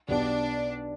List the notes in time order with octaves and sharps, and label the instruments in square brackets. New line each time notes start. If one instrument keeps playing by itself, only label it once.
[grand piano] B1 B2 B3 G4 [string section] D4